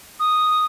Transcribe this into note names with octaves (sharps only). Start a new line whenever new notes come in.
D#6